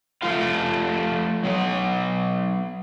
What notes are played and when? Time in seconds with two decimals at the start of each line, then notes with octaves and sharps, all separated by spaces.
0.22 F3 A3 F4 F5
1.44 F#3 B3